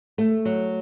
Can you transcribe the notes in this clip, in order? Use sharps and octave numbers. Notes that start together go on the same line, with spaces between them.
A3
F#3